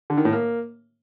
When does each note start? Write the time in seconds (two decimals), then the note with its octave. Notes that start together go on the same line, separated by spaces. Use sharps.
0.10 D3
0.17 D#3
0.25 A2
0.33 A#3